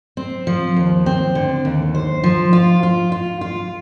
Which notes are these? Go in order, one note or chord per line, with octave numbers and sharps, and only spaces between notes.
C4
F3
D#2
C4
D3
D#2
C5
F3
F4
F4
F4
F4